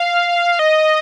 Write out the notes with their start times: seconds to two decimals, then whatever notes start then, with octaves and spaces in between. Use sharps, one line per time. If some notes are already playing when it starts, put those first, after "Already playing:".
Already playing: F5
0.59 D#5